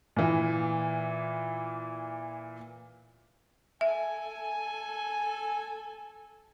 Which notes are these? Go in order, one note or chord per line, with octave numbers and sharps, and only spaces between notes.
A#2 E3
A4 E5 G#5